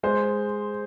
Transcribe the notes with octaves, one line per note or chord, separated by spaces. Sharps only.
G#3 C5